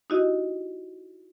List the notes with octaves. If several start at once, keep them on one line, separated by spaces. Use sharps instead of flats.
D#4 E4 F#4 G4 D#5